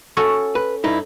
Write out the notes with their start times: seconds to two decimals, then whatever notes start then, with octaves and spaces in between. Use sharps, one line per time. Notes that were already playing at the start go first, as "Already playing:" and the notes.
0.17 C#4 F#4 A4
0.55 B4
0.84 G2 D#4 E4